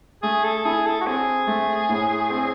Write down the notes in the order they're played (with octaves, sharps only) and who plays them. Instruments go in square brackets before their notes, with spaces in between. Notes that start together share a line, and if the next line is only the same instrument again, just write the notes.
[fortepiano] A3 [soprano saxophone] G#4
[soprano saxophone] A4
[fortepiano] E4 [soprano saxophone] G#4
[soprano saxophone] A4
F#4
[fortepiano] C4 [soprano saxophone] G#4
[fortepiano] A3
A2
C4